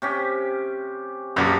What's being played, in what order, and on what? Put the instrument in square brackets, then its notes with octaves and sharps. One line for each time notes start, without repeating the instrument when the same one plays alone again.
[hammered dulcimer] C3 C#4 G4
[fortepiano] A#1 F#2 [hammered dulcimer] G4 B4